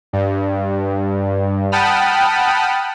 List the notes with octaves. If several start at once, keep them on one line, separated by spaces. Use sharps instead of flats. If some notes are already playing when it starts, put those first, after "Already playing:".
G2
F#5 G5 A5 B5 D#6 F6